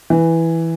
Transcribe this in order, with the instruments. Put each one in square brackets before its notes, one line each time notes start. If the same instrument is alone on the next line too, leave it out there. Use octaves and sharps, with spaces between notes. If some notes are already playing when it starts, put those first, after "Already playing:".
[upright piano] E3